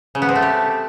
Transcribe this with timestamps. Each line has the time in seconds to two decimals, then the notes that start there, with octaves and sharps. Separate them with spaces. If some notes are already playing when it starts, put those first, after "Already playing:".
0.15 C#3
0.22 B3
0.29 C4
0.35 A3
0.42 G4